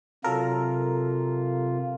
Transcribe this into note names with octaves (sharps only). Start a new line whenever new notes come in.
C3 F#3 F4 A4 A#4